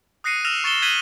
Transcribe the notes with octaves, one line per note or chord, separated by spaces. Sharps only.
D#6 F#6 A#6 C7 C#7 D#7
E6 F6 A#6 E7 F7
C#6 A6 C#7 E7 G7
F#6 G#6 B6 D#7 F#7 G7